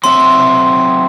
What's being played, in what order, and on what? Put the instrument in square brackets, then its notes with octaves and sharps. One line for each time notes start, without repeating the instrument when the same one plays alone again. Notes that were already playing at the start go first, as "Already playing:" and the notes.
[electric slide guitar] F#3 C4 E5 [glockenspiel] C6